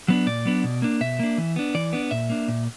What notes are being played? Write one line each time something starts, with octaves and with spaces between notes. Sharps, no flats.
F#3 B3 D4
A#2 D5
F#3 B3 D4
B2
A#3 D4
B2 E5
A#3 D4
E3
B3 D4
E3 D5
B3 D4
A#2 E5
A#3 D4
A#2